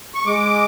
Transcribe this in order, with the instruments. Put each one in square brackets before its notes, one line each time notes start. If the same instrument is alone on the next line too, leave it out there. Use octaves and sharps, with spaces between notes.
[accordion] C#6
G#3 D6